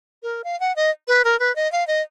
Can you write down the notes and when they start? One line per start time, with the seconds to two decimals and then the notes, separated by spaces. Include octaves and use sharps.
0.23 A#4
0.44 F5
0.60 F#5
0.76 D#5
1.08 B4
1.24 A#4
1.39 B4
1.56 D#5
1.72 F5
1.87 D#5